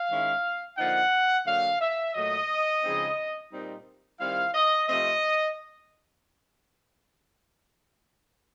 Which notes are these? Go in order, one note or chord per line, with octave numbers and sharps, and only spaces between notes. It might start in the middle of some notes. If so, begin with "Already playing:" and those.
Already playing: F5
D#3 G#3 C#4 E4
D3 F3 A#3 D#4 F#5
D3 F#3 A#3 F5
E5
A#2 F#3 A3 D#5
C#3 F3 G#3 C4 D#4
A#2 G3 C4 D#4
D#3 G3 C4 E4 F5
D#5
C3 F3 A3 C4 D#5